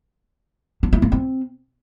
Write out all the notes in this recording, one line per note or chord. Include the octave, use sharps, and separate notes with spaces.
D4
E4
A#3
C4